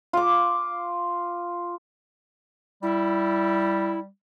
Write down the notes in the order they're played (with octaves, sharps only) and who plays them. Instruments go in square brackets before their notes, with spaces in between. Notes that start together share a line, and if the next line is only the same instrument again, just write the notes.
[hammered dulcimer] F4 D6
[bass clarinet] G3 [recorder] E4